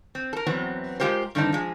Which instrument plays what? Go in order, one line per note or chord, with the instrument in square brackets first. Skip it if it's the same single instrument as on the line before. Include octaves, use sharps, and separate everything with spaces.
[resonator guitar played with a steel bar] C4
A4 A#4
E2 E3 F#3 B3 C4
G#3 F4 G4 A#4 C5
G2 D3 D#3 C4 D4 D#4
F3 G#3